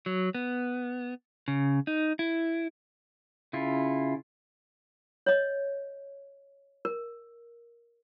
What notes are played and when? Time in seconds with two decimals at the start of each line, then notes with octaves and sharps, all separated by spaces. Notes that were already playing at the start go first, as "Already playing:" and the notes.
0.06 F#3
0.35 B3
1.48 C#3
1.87 D#4
2.19 E4
3.53 C#3 E4 F4
5.26 C#5 D#5
6.85 A#4